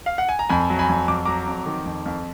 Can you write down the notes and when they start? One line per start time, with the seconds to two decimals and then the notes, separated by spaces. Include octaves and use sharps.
0.06 F5
0.18 F#5
0.29 G#5
0.39 A#5
0.49 F2 G#5 B5
0.70 F#3
0.79 G#5 B5
0.89 F2
1.08 F2 D6
1.25 F#3 A#5 D6
1.47 F2
1.66 D#3
1.85 F2
2.06 F2